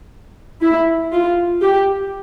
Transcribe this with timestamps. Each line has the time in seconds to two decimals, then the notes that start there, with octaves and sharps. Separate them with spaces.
0.62 E4
1.13 F4
1.62 G4